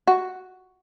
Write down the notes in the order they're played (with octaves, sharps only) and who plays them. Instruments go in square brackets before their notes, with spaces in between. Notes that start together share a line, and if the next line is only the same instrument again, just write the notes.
[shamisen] F#4